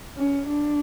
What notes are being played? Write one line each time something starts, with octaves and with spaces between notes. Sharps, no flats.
C#4
D4